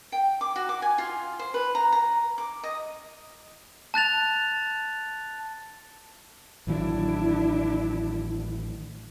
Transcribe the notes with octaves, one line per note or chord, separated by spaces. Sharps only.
G5
D6
F#4
D6
G#5
F4
C5
B4
A#5
A#5
D6
D#5
A5 F#6 A6 F7
A1 D#3 F#3 D4 E4